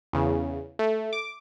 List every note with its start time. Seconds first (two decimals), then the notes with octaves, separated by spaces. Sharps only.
0.13 E2 C#3
0.79 A3
1.13 D6